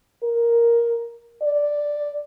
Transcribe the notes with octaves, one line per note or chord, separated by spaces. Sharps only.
A#4
D5